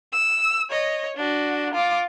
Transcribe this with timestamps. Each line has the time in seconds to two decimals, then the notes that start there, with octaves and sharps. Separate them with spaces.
0.12 E6
0.69 C#5 D#5
1.17 D4 F#4
1.74 F4 D6